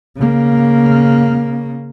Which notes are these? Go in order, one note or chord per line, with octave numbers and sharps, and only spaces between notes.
C#3 A#3